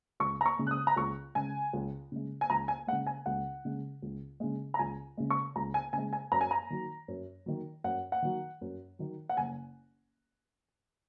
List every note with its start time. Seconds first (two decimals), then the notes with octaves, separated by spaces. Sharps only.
0.20 C#2 C#6
0.41 A#5
0.46 C#6
0.59 C#3 G#3
0.67 F#6
0.71 D#6
0.87 A#5
0.96 C#2 C#6
1.35 C#3 G#3 G#5
1.73 C#2
2.12 C#3 G#3
2.41 G#5
2.50 C#2 A#5
2.68 G#5
2.87 G#3 F#5
2.92 C#3
3.07 G#5
3.26 C#2 F#5
3.65 C#3 G#3
4.02 C#2
4.40 C#3 G#3
4.74 A#5
4.79 C#2 G#5
5.17 C#3 G#3
5.30 C#6
5.56 C#2 A#5
5.74 G#5
5.93 C#3 G#3 G#5
6.13 G#5
6.32 F#2 A#5
6.41 G#5
6.51 A#5
6.70 D#3 F#3
7.08 F#2
7.46 D#3 F#3
7.84 F#2 F#5
8.12 F#5
8.22 D#3 F#3
8.61 F#2
8.99 D#3 F#3
9.29 F#5
9.37 F#1 G#5